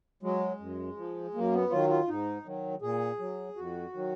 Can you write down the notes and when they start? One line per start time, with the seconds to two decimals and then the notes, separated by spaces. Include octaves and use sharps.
0.23 F#3 G#3
0.60 F#2
0.97 F3
1.34 F#2 A#3
1.53 B3
1.71 D#3 F#3 F4
1.90 F4
2.08 G#2 D#4
2.45 D#3 F#3
2.82 A#2 G#4
3.19 F#3
3.56 F2 F#4
3.93 D#3 F#3